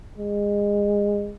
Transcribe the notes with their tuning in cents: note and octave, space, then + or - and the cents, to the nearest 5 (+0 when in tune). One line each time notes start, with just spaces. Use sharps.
G#3 -25